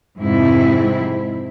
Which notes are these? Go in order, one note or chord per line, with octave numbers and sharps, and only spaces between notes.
F2 G#2 C3 C4 E4